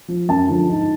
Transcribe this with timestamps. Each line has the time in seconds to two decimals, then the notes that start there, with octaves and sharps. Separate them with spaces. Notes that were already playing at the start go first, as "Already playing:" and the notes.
0.08 F3
0.29 F#2 A5
0.49 D3 F3
0.69 G#2